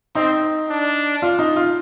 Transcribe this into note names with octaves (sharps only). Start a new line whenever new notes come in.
C4 D#4
D4
F4
D#4
F4